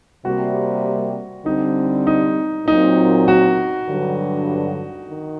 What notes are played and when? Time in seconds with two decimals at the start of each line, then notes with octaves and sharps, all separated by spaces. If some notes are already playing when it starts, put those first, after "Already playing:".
0.25 C3 G3 A#3 F#4
1.45 D3 G3 C4 D#4
2.07 D#4
2.67 A#2 F#3 C4 D#4
3.28 F#4
3.88 G2 D3 F#3
5.09 D#3